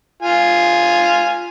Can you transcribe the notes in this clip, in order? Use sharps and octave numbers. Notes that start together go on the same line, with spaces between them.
F4 G#5